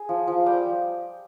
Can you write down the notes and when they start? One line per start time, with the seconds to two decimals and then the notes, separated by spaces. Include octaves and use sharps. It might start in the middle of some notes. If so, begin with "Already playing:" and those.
Already playing: G#4 G#5
0.09 F3
0.27 F3
0.46 G3 G5